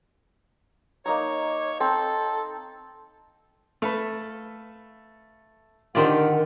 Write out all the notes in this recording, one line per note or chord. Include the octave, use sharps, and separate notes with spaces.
A#3 D#4 C#5 A#5
C4 A4 A5
A3 A4 B4 F5
D3 D#3 F4 G4 A#4 C5 D5 F#5